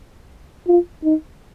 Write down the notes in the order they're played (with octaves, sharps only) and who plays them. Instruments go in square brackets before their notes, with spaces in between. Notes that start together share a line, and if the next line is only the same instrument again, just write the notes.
[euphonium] F4
D#4